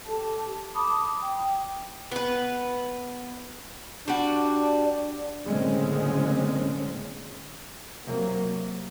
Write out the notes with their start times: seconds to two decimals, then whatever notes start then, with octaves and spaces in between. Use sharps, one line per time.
0.07 G4 A4 A5
0.74 A5 B5 D6 D#6
1.21 G5
2.12 B3 B4
4.08 G3 D4 F#4
5.45 F#1 A2 D3 G#3 C4 C#4
8.06 C3 F#3 A#3